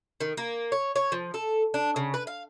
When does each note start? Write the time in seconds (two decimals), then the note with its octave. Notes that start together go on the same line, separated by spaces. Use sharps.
0.20 D#3
0.37 A#3
0.72 C#5
0.96 C#5
1.12 F3
1.34 A4
1.74 D4
1.96 C#3
2.14 B4
2.27 F5